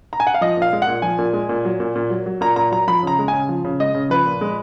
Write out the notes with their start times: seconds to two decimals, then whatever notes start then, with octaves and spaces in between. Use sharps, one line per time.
0.13 A#5
0.20 G#5
0.27 F#5
0.34 F5
0.41 F3 D#5
0.57 A#2 F5
0.73 G#3
0.82 F#5
0.87 A#2
1.02 F3 G#5
1.19 A#2
1.33 G#3
1.49 A#2
1.65 F#3
1.80 A#2
1.96 A#2
2.10 F#3
2.26 F#3
2.41 A#2 A#5
2.56 A#2 A#5
2.71 F#3 A#5
2.87 F3 B5
3.03 C#3 A#5
3.19 G#3
3.28 C#3 G#5
3.49 F3
3.65 C#3
3.80 G#3 D#5
3.94 C#3
4.10 F3 B4
4.26 A#2
4.41 G#3